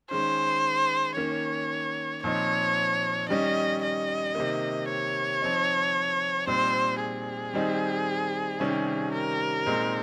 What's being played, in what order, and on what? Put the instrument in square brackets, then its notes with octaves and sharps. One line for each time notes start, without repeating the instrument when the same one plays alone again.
[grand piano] D#3 G#3 C#4 [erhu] C5
[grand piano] D#3 A#3 C#4 [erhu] C#5
[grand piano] A#2 F3 C4 D#4 [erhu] C#5
[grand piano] D#3 G3 C#4 [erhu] D#5
[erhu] D#5
[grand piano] C3 D#3 A#3
[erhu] C#5
[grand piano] F3 C4 D#4
[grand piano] A#2 G3 C4 D#4 [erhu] C5
[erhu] G#4
[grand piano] D#3 G3 C4 D#4
C3 D#3 G3 C#4
[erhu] A#4
[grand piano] A#2 G#3 C4 D#4